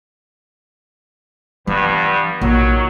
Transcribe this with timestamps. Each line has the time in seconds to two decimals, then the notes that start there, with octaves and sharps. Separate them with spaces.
1.67 G2 E3 F3 B3
2.41 A#1 D#3 F#3